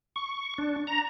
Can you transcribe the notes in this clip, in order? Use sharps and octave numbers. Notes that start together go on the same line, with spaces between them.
C#6
D4
A#5